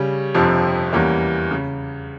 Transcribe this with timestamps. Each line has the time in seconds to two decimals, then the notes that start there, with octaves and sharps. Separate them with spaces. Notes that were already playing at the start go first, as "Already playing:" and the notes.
Already playing: C#3 G3 C#4
0.34 G1 F2 C3 F3
0.93 E2 E3 G3 A#3 C#4
1.51 C#3